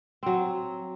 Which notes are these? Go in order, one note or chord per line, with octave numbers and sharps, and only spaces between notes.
F#3 C4